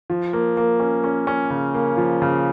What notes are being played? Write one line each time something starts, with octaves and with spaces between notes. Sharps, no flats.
F3
A#3
A#3
C#4
C#4
C#4
C#3
A#3
F3
C#3